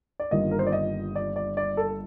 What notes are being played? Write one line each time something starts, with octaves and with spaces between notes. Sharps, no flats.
D5
G1 G2 D#3 A#3 F4 D#5
A#4
C5
D5
D#5
D5
D5
D5
A4